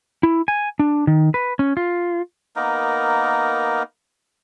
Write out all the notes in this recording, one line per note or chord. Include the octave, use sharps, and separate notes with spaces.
E4
G#5
D4
D#3
B4
C#4
F4
A#3 B3 D#4 A#4